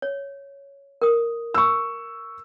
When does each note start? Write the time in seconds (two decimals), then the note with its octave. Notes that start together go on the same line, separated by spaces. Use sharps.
0.02 C#5
1.02 A#4 D#6
1.54 C#6 E6